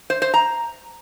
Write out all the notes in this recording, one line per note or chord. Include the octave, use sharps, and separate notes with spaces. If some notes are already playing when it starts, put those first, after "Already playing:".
C5
C5
A#5